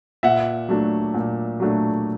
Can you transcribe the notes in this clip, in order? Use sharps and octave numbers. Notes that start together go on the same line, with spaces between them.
A#2 E5 F#5
F#3 A3 D4
A#2
F#3 A3 D4